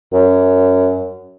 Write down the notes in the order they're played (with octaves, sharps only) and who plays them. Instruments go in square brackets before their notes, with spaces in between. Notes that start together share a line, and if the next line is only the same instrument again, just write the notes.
[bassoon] F#2